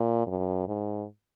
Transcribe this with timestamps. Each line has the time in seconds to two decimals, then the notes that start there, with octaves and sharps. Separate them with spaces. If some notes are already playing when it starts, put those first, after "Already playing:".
Already playing: A#2
0.27 F#2
0.68 G#2